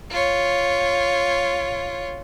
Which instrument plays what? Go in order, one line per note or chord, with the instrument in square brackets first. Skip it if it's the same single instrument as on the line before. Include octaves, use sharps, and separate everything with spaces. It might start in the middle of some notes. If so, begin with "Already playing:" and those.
[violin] F4 C#5